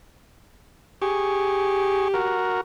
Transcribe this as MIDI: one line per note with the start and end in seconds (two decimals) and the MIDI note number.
1.02 2.52 67
1.02 2.08 68
1.02 2.08 85
2.14 2.61 66
2.14 2.61 70